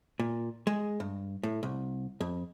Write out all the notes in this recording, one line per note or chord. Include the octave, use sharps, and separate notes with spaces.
A#2
G#3
G2
A2
C2
F2